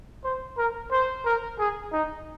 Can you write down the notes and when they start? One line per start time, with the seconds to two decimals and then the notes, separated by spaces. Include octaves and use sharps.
0.24 C5
0.58 A#4
0.92 C5
1.25 A#4
1.59 G#4
1.93 D#4